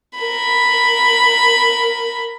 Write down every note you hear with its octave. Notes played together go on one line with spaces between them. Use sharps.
A#4 B5